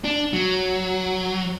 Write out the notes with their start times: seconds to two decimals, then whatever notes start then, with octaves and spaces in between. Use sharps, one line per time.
0.04 D4
0.33 F#3